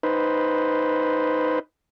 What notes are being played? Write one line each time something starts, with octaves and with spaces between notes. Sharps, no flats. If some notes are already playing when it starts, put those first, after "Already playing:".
D#4 B4 C5